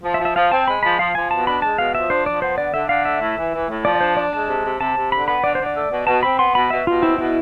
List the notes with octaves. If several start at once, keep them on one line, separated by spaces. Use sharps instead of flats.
F3
E5
F3
E5
F3 F5
C4 A5
G#3 B5
F3 B5
F3 F5
F3 G#5
B2 A5
D4 B5
G#3 A5
B2 F5
F3 E5
D4 C5
F3 D5
B3 C5
D3 D5
D3 E5
D3 F5
A3 E5
A2
E3
E3
A2
F3 D5
D5
D4 C5
D4 D5
G#3 A5
C3
C3
C3 A5
C3
D3 B5
B3 B5
D3 D5
D3 C5
D5
A3
B2
B2 A5
C4 B5
B3 C6
B2 B5
B2 E5
B2 F4
C4 E4
B2 E4